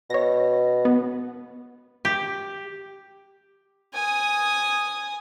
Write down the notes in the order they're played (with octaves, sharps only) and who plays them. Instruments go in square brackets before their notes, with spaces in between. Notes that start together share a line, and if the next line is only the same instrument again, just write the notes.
[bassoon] B2 [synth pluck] C#5 A#6
[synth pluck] B3
[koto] G4
[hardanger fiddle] G#5 D#6